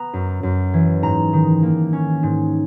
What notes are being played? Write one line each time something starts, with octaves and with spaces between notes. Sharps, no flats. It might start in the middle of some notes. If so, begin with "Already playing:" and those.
Already playing: B3 A#5
F#2
F#2
E3
G#2 A#5
D#3
A#3
C#4
G#2